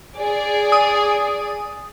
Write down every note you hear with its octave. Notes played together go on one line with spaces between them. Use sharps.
G#4 D5
D#6